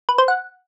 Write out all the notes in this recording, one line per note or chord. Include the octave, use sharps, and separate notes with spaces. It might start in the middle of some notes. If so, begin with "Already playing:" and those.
B4
C5
F#5